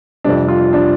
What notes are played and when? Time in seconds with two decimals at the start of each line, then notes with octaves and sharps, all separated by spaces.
0.24 F2 C3 G3 D4
0.48 F4
0.73 D4